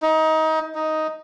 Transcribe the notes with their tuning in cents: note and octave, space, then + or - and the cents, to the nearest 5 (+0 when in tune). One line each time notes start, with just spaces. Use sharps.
D#4 +25
D#4 +5